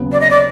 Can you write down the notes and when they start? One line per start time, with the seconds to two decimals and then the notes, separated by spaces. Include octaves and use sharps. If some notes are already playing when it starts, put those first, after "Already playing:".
Already playing: D#2 C#3 F#3 B3
0.12 D5
0.20 D#5
0.30 D5